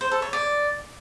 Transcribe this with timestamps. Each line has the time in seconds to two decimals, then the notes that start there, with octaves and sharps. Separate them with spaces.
0.01 C5
0.11 A4
0.22 C#5
0.33 D5